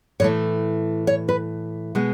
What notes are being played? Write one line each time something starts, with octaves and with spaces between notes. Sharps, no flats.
A2 E3 A3 C#5
C#5
B4
B2 G#3 B3